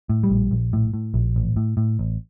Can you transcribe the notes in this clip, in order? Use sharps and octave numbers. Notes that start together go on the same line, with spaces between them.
A2
G3
A#1
A#1
A2
A2
A#1
A1
A2
A2
A1